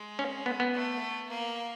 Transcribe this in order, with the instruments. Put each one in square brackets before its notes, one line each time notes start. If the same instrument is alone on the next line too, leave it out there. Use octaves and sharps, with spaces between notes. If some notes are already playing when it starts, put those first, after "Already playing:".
Already playing: [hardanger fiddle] G#3
[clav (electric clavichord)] C#4
B3
B3
[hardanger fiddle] A3
A#3